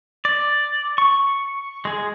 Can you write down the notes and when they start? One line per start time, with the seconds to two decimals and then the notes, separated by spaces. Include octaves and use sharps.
0.25 D5
0.98 C#6
1.85 G#3 G#4